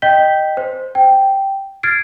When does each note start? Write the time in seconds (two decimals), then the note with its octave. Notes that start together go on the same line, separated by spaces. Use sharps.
0.02 D#5 G5 G6 B6 G7
0.57 C5
0.95 G5
1.83 F6 G#6 A6 C7 D7